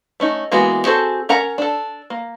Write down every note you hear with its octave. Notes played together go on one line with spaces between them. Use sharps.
A3 C#4 D#4
E3 G#3 A#3 B3 F#4
C4 F#4 G#4 A4 C5
C#4 A#4 F#5 A#5
D4 A4
A#3